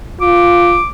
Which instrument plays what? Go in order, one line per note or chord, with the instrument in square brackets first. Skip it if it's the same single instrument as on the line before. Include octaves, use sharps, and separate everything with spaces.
[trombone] F4 [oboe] D6